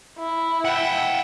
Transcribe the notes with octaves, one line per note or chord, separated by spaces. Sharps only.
E4
E5 F#5 G5